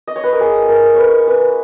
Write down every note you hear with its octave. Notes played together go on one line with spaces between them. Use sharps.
D#5
C#5
B4
A#4
A#3 G#4
F4
A#4
A#3
B4 C#5
C#4
A#3 B4